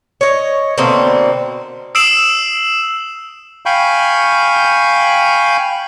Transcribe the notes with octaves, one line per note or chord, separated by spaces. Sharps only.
C#5 D#5
B2 D3 A#3 C4
D#6 E6 C7 D7 E7 F#7
F5 G5 G#5 B5 C#6 G6